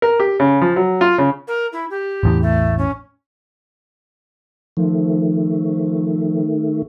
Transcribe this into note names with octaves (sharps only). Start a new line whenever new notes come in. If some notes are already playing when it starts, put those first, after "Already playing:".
A#4
G4
C#3
F3
F#3
F4
C#3
A#4
E4
G4
A1 E2 A2
A3
C#4
D#3 F3 A3